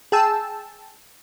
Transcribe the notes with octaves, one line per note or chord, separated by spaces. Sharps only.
G#4 G5 A5 E6